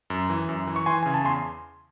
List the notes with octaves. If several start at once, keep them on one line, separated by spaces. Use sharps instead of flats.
F#2
E3
F#2
E3
C#6
E3 G#5 C6
C#3 G#5
A5
E2 G#5 C6